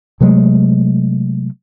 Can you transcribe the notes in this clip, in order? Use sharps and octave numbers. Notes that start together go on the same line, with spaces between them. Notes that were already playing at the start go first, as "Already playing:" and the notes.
C3 F#3 G#3 A3